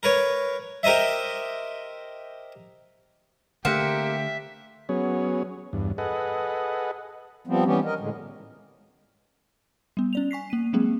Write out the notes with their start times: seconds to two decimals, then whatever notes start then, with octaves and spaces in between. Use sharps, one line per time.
0.03 A#4 B4 C#5
0.83 G4 A#4 C5 D#5 E5
3.65 D3 A3 A#3 C4 G4 E5 F#5
4.89 F#3 B3 C#4 G#4 C#5
5.73 E2 G2
5.98 G#4 A4 B4 D#5 F#5
7.47 F3 G3 B3 C4
7.65 E3 G3 B3 C#4 G4
7.85 A#4 D#5
8.00 A2 D3 G#3
9.97 G3 B3
10.13 C#4 D5 F7
10.31 G#5 C#6 B6 C7
10.50 A#3 D#7
10.73 F#3 G#3 A#3 C4 G#4